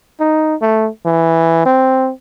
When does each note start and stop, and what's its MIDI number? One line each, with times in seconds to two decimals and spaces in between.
0.20 0.55 63
0.62 0.89 57
1.06 1.65 52
1.66 2.11 60